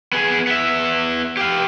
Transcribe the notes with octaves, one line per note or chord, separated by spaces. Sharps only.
B3 G#4
B3 E5
G4 F5